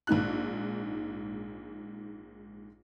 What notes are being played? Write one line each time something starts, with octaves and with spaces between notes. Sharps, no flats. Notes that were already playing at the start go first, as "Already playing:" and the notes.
A#1 G#2 D#4 F#6